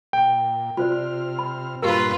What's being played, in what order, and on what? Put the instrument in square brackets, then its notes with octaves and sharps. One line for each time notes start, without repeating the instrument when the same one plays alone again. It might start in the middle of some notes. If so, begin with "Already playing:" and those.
[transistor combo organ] A#2 [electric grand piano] G5
[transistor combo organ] C3 F6 [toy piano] F4 C5 D5
[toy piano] B5
[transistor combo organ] G2 A#2 A#3 [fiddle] F4 B4 [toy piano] G4 A#4